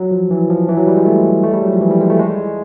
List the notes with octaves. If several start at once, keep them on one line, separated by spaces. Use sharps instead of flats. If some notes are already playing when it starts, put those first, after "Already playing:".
Already playing: F#3
F3
E3
F3
E3
F#3
G3
G#3
A3
A3
G3
F#3
F3
E3
G3
G#3
A3
G#3